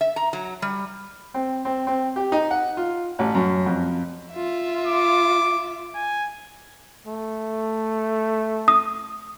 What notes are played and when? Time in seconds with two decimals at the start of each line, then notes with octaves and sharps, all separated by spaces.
0.01 E5
0.16 A#5
0.33 F#3
0.62 G3
1.34 C4
1.65 C4
1.87 C4
2.16 G4
2.32 D#4
2.51 F#5
2.77 F4
3.19 A1
3.34 F#2
3.66 F2
4.33 F4 E5
4.87 D6
5.95 G#5
7.07 A3
8.68 D#6